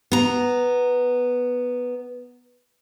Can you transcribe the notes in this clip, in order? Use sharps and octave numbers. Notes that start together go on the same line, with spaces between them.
B3 A#5